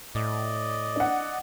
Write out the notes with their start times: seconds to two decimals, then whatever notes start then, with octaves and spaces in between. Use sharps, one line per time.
0.15 A2 D5 D#5
0.96 D4 F#5